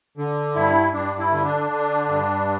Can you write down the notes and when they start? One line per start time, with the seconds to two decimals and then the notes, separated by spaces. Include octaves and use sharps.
0.17 D3
0.55 G2 E4
0.93 G2 D4
1.19 E4
1.32 D3
1.44 D4
1.70 D3
2.08 G2